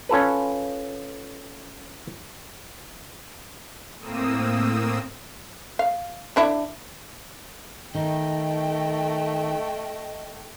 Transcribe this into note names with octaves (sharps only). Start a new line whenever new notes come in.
C#4 F4 A4 B4
A2 A#3 C4 D#6 E6
F5
D3 D4 E4
D#3 A3 D#5 G5